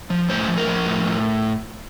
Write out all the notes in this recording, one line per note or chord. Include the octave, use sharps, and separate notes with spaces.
F3
A2 C5
F3
A#4
F3
A2
A2